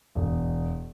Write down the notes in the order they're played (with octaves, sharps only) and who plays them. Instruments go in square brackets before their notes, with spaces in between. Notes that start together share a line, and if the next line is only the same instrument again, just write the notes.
[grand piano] E1